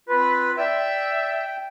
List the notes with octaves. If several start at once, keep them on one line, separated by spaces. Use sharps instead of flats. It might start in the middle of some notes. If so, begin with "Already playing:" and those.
C4 F4 B4
D5 E5 G5